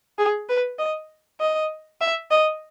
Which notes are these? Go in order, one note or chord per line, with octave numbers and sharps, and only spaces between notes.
G#4
B4
D#5
D#5
E5
D#5